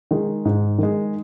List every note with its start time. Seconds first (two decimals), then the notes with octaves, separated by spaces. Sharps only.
0.11 D#3 G#3
0.45 G#2
0.78 D#3 G#3